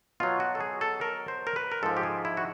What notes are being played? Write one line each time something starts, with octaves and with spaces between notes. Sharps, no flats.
B2 F#3 F4
F#4
A4
G#4
A4
A#4
C5
A#4
B4
A#4
G#2 F3 A4
G4
G#4
E4
F#4